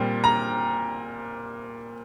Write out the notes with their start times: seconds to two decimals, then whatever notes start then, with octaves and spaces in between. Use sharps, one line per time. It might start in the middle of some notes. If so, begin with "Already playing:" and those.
Already playing: A#2 G3 C4
0.24 A#5